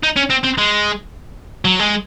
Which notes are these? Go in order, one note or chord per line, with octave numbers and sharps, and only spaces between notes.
D#4
C#4
C4
C4
G#3
F#3
G#3